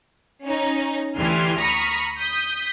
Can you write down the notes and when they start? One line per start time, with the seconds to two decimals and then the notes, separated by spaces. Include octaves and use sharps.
0.43 C#4 D#4
1.16 D2 E3 G3 G#5 C6 F6
1.59 A#5 B5 C#6 D#6 F6
2.18 D#6 G6 B6